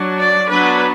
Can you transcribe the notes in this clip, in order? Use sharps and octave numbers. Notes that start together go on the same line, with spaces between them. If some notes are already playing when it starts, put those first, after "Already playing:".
Already playing: F#3 D4
D5
F#3 B3 D4 B4